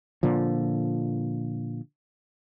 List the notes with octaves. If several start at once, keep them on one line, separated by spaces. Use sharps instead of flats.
A#2 D3 F3